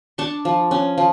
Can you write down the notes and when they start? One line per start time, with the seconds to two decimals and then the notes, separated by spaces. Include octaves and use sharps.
0.18 D4 A5 C#6
0.45 F3
0.71 C#4
0.98 F3